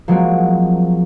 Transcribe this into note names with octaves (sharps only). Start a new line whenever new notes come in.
F3 F#3 G#3 A#3 C4 F#4